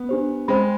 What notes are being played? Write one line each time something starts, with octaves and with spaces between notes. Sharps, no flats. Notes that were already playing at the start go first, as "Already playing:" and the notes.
Already playing: B3
D4 G4 C5
G#3 C5 G5 B5